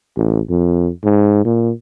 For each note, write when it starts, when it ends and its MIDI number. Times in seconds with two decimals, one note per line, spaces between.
0.16 0.40 33
0.50 0.89 41
1.04 1.43 44
1.45 1.71 46